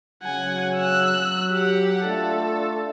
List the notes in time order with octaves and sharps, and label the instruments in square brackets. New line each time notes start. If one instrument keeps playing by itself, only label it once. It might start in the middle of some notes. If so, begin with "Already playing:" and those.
[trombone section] C#3 F#3 [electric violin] F#5 G#5
[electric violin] E6 F#6
[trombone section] F#3
[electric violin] G4 F#5
[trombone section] A3 D4 F4 [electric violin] A4